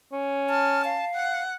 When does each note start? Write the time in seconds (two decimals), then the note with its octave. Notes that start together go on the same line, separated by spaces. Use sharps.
0.12 C#4
0.50 A5 F6
0.85 F5
1.15 F#5